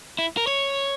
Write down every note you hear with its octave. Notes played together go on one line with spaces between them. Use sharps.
E4
A#4
C#5